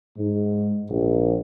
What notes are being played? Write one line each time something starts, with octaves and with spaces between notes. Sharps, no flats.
G#2
A#1